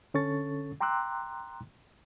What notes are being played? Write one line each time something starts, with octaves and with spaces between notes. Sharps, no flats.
D3 C#4 A4 C#6 A6
G5 A#5 C6 D6 E6 F#6